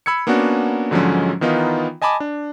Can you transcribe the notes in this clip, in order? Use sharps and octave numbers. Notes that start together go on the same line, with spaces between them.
B5 E6 G#6 C#7
A#3 B3 C#4 D4 F#4
G#2 D3 F3 F#3 G#3 C#4
D#3 E3 B3 D#4 F4
D#5 G#5 A5 B5 D6
D4